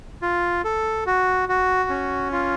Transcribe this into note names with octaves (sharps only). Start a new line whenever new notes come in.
F4
A4
F#4
F#4
C#4
F4